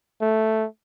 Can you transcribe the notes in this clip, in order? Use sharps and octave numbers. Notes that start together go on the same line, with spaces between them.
A3